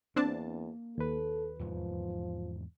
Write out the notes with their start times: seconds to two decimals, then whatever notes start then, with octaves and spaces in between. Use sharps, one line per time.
0.16 E2 A#3 C4 D4 A5
0.98 D#2 A4 B4
1.59 E2 G#2 C3 F3